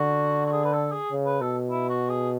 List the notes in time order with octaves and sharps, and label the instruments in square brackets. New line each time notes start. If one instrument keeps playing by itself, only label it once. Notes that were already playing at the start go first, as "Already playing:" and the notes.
Already playing: [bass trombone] D3 [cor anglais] F#4
[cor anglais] F#4
G#4
B4
A4
G#4
[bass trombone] C#3
[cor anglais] B4
[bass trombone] B2 [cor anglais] A4
[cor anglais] E4
F#4
G#4